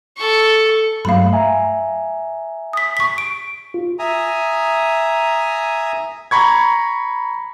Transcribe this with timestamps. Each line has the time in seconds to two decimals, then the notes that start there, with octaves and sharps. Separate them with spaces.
0.17 A4 C#6
1.05 G2 F#3 A3 F5 B5
1.33 E5 G#5 A#5
2.73 D#6 B6
2.97 C#6 B6
3.18 D7
3.74 F4
3.99 E5 G#5 A#5 D#6
6.31 A#5 B5 C#6 G#6